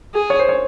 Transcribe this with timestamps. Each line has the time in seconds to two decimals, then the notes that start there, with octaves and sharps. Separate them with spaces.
0.14 G#4
0.30 C#5
0.39 C5
0.49 C#5